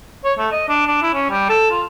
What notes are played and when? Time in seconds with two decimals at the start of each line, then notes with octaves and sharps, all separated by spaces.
0.24 C#5
0.39 A3
0.52 D#5
0.68 D4
0.87 D4
1.02 E4
1.14 C#4
1.30 G3
1.49 A4
1.71 F4